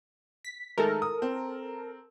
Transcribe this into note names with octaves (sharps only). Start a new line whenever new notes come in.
B6
D#3 G#3 A3 A4 A#4
D#6
C4